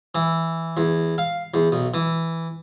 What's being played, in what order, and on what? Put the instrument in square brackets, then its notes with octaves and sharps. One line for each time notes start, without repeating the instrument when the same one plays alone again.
[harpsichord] E3
E2
F5
E2
B1
E3